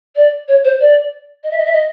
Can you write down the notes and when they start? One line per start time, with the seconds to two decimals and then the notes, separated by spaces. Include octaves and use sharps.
0.16 D5
0.48 C#5
0.64 C5
0.80 D5
1.44 D#5
1.51 E5
1.58 D#5
1.65 E5
1.72 D#5